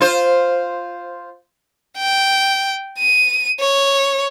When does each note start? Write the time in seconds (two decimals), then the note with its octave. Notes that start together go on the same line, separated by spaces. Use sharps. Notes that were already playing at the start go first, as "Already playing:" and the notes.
0.01 F4 C5
1.98 G5
2.98 D#7
3.60 C#5